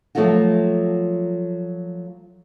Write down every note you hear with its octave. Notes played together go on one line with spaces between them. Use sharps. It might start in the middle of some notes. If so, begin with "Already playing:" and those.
F3 F#3 A3 A#3 F4 F#4